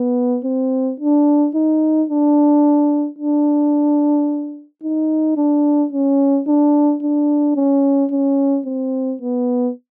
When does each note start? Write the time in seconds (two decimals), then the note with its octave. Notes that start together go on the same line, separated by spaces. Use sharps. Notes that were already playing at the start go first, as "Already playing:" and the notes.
Already playing: B3
0.44 C4
1.00 D4
1.55 D#4
2.10 D4
3.18 D4
4.83 D#4
5.37 D4
5.92 C#4
6.47 D4
7.03 D4
7.56 C#4
8.11 C#4
8.66 C4
9.22 B3